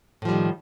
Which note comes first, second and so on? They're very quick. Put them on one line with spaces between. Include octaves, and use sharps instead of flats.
A2 F3 G3 D#3